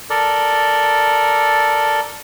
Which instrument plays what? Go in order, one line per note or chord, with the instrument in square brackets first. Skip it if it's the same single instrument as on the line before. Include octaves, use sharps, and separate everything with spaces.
[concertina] A4 A#4 D5